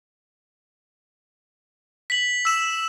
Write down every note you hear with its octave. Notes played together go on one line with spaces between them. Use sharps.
B6 F#7
E6 E7